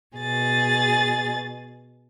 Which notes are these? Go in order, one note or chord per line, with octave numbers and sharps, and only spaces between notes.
B2 G#4 A6